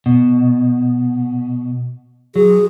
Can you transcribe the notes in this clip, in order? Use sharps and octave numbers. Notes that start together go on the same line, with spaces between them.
B2
F#3 G#4